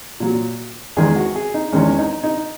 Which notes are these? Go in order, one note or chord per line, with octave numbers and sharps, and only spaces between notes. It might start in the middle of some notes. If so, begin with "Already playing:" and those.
A#2 F#3
E2 D#3 G#3 G#4
F#4
G#4
D#4
E2 D#3 G#3 C#4
D#4
D#4